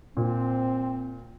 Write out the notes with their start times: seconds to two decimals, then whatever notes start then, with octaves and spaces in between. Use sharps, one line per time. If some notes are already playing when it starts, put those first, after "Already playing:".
0.17 A#2 C4